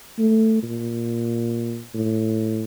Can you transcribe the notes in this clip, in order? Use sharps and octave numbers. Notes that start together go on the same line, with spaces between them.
A3
A#2
A2